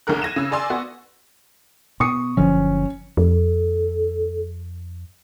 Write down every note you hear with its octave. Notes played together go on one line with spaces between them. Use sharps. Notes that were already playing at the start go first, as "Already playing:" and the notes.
B1 D3 G#4 A#4 F#6
G#6 A#6 D#7 E7
C#3 E6
G#4 D5 G#5 C6 E6
B3 F#4
B2 C#6 D#6 C#7
F#1 D3 F3 C#4
F2 A4